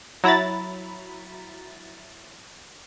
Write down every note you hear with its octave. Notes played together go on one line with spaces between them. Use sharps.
F#3 E4 A#5 B5 A6